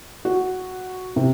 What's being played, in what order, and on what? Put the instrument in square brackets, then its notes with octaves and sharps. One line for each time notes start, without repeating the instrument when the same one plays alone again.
[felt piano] F#4
C3